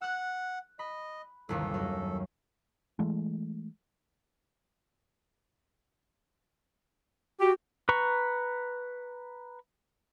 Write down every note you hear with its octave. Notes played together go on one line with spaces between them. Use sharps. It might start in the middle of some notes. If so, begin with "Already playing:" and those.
F#5 E6 F#6
D#5 B5
G1 D#2 C3 A4
F#2
E3 G#3 A3
F#4 G4
B4 A#5 C#6